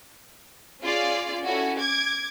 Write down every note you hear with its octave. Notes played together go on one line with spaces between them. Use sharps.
C#4 F4 G#4 D5
C#4 E4 F#4 A4
D6 G#6 D7